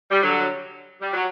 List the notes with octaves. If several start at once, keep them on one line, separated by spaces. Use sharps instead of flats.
G3
D3 F#3
G3
F#3